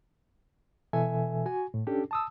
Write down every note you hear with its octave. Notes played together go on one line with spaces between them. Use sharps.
B2 E3 A4 E5 G#5
F#4 G#5
A2
C#4 D4 G4 A4
A5 D#6 E6